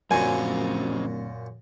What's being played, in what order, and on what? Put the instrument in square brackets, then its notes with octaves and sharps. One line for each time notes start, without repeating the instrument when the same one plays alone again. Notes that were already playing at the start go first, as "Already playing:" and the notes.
[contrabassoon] D1 [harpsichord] F#2 A#2 [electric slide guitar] F3 C#4 C5 [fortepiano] G#5